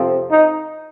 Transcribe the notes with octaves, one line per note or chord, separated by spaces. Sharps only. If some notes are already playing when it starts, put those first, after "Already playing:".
Already playing: F2 C3 F3 C4
D#4